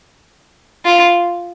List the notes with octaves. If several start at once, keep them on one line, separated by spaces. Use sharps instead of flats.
F4